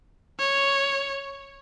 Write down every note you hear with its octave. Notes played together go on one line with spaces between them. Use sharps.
C#5